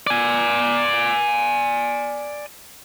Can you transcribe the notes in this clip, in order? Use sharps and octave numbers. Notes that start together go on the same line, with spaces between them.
D5 G#5